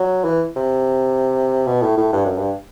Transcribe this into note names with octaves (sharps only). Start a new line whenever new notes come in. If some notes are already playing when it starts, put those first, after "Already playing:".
Already playing: F#3
E3
C3
B2
A2
A2
G2
F#2
G2